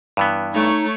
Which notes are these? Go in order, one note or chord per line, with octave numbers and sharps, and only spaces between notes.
G2 E3 B3
A3 D#4 C#5